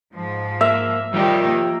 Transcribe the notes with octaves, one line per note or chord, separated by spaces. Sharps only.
G#2 F3
A#3 E5
D#3 F3 G3 D#4 G4
A#3